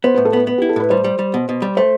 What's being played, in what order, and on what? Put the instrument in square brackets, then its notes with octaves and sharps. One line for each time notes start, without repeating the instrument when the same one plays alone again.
[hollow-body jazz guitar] B3 [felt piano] C5
[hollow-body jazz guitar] A2 [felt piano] B4
[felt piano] A4
[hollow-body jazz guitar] B3 [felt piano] B4
[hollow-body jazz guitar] B3 [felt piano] B4
[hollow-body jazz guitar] E4 [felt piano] G4
[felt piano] A4
[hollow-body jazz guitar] A2 [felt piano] B4
[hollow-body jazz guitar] G3 [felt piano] C5
[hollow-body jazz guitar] G3
G3
B2
B2
G3
[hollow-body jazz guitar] A3 [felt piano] C5